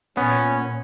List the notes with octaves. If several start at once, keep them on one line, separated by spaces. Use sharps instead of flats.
A#2 B3 C#4